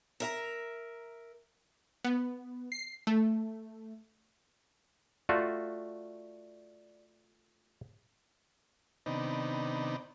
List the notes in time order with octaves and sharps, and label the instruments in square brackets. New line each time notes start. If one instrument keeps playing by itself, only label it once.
[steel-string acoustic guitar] A#4 E5 A#5
[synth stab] B3
C7
A3
[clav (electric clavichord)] A3 F4 F#4 [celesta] D5
[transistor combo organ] C3 D#3 B3 D4 D#4